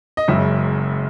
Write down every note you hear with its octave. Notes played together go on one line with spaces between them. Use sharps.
D#5
F#1 F#2 C#3 G#3 C#4 E5